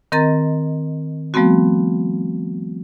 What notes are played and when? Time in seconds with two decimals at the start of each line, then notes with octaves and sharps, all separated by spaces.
0.12 D#3 C4 A#4 D#5 A#5 A6
1.34 F3 G3 A3 B3 C4 F#4